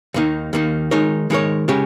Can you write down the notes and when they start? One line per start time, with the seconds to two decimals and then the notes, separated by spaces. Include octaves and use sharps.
0.14 D#2 D#3 A#3 D#4
0.53 D#2 D#3 A#3 D#4
0.91 D#3 G#3 D#4 A#4 C#5
1.30 D#3 G#3 D#4 A#4 C#5
1.68 C#3 G#3 C#4 G4 C#5